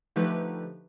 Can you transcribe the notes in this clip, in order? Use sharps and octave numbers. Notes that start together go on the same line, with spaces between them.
D3 F3 A3 D#4 G4 B4